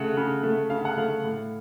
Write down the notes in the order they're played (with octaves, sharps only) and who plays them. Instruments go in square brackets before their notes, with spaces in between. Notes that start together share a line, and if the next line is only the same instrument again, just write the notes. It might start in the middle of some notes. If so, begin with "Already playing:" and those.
Already playing: [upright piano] C#3 A3 F#5
C#3
A3
C#3 F5
F#5
A3 F5
A2